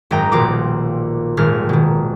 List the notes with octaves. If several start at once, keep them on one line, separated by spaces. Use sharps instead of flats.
G#1 F#2 D#5 G5 A#5
D#1 A#1 B2 F4 D6 A#6
D#1 G#1 G#3 F6
B2 D#3